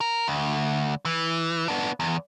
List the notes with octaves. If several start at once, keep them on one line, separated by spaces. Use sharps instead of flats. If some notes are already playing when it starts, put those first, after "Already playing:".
A#4
D2
E3
B3 D4
E2